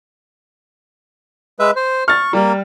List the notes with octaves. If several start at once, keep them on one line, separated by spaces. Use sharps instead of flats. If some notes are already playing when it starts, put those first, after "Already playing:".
G#3 B4 E5
C5
C#6 F6 A6
G3 A#3